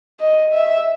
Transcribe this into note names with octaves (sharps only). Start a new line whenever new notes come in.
D#5
E5